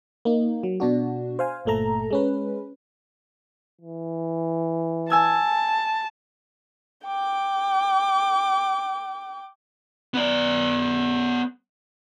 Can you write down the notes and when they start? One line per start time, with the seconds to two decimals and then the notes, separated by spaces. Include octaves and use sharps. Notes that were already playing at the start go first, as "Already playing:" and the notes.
0.25 A#3 D#4
0.63 F#3
0.80 B2 D4 F#4
1.39 C5 F5 G#5
1.65 G1 A#2 A3 A4 A#5
2.10 G#3 C#4 B4
3.81 E3
5.10 G#5 A5 E6 G#6
7.05 G5 D6
10.14 B3 D5